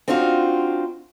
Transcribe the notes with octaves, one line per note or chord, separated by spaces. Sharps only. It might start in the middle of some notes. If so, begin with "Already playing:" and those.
C4 D4 D#4 F4 F#4